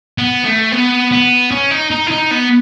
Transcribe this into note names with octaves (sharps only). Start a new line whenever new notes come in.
B3
A3
B3
B3
C#4
D#4
D#4
E4
D#4
B3